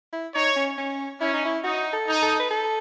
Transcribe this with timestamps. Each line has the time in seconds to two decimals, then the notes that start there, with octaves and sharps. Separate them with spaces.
0.13 E4
0.35 D#4 C#5
0.56 C#4
0.78 C#4
1.21 C#4 E4
1.33 D#4
1.45 E4
1.64 D#4 F#4
1.93 A4
2.08 D#4
2.22 A4
2.40 B4
2.51 A4